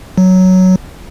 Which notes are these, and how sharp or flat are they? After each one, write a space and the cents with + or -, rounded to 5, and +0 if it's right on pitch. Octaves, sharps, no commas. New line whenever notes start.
F#3 +5